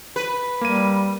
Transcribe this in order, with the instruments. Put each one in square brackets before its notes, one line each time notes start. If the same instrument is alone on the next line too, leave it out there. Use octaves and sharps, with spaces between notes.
[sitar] B4
[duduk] G3 [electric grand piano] A#3 D#7